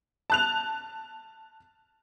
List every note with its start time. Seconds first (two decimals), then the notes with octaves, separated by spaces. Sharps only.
0.30 A5 F#6 F7